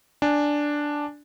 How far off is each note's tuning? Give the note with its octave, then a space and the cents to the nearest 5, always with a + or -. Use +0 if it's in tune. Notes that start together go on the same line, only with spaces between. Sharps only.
D4 +0 G#5 +0